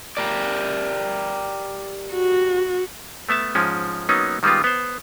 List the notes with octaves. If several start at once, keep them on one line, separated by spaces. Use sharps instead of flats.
G4 A#4 D5
F#4
A3 B3 E5 A5
G#2 F3 G#3 C#4
F#3 A#3 B3 C#4 D#4
D#3 G3 G#3 B3 F4
B3 C5